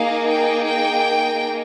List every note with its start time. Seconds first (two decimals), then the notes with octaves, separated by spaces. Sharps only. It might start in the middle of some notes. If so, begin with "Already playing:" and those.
Already playing: A#3 D#4 G#4 F5
0.28 G5
0.66 G5